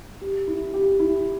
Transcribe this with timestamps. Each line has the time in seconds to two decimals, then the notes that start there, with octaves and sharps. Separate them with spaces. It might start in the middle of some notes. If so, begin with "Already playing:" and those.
0.21 G4
0.47 E4
0.74 G4
1.00 E4